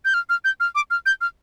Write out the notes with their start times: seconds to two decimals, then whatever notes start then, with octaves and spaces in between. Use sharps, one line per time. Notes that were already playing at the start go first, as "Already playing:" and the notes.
0.05 G6
0.14 F6
0.30 F6
0.45 G6
0.60 F6
0.75 D6
0.91 F6
1.06 G6
1.21 F6